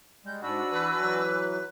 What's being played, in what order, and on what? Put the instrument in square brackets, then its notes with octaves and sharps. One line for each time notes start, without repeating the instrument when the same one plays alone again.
[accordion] G3 G#3 [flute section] G6
[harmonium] G#2 [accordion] D4 F#4 [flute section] G#5 B5 E6
[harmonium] E3 [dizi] B4
[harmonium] E3 F#3